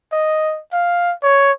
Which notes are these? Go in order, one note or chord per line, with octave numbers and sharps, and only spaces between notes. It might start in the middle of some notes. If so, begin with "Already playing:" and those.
D#5
F5
C#5